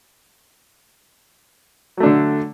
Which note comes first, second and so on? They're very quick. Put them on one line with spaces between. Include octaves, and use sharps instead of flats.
F#3 A3 D4 D3